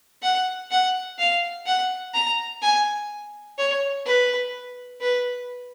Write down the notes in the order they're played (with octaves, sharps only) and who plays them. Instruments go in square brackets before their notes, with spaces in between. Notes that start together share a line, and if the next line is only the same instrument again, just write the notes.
[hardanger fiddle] F#5
F#5
F5
F#5
A#5
G#5
C#5
B4
B4